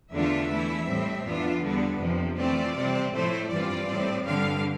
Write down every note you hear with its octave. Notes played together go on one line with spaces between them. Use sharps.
E2 D3 A3 D4 F4 E5
E3 A3 E4
A2 G3 C4
F2 E3 B3 D4 F4
E2 D3 G3 B3 D4
F2 C3 F3
E3 A3 C4 F4 D5
C3 G3 C4
A2 F3 A3 E4 C5
G2 E3 G3 C4 F4 D5
A2 G3 C4
G2 D3 G3 F5